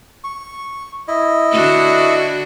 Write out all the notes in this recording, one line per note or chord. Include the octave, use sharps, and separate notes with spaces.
C#6
E4 D#5
D3 D4 F#4